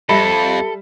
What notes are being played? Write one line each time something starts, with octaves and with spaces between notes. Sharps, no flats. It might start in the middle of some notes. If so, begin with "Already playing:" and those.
F2 G3 A4 E5 B5